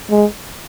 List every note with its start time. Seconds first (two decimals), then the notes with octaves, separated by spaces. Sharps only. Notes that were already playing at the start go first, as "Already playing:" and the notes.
0.11 G#3